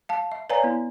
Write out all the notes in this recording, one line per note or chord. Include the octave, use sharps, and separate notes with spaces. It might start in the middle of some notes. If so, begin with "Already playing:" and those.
F5 A5
E5
B4 C#5 D5 F5 G#5 A#5
B3 E4